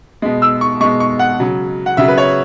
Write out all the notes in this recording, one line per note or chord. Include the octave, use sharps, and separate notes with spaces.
B2 G#3
E6
C#6
B2 G#3 C#6
C#6
F#5
C#3 F#3
F#5
C#3 F#3 E5
B4
C#5